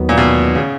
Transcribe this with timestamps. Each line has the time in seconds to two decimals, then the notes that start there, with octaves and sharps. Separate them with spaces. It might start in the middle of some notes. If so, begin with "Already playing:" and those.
Already playing: D#2 D#3 F#3 B3
0.09 A#2
0.18 B2
0.55 C#3